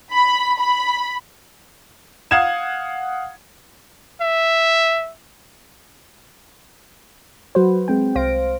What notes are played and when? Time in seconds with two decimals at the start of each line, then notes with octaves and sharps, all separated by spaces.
0.13 B5
0.59 B5
2.31 F5 F#5 D#6 G#6 E7
4.21 E5
7.55 F#3 F#4 B4 C5
7.88 G#3 C4 G5
8.15 C2 C5 F5 A#6 D7